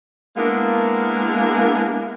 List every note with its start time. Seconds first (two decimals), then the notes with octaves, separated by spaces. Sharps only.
0.37 G#3 A#3 B3 D4 E4 A#4